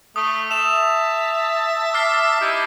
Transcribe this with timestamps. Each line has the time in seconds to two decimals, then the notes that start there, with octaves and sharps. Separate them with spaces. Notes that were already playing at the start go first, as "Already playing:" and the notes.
0.16 A3 D#6
0.51 E5 A5 E7 F7
1.94 D6 F6 C7
2.41 D#4 E4 G4